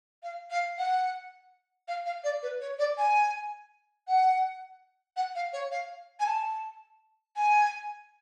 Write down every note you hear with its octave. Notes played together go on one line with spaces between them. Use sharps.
F5
F5
F#5
F5
F5
D5
B4
C#5
D5
G#5
F#5
F#5
F5
C#5
F5
G#5
A5
G#5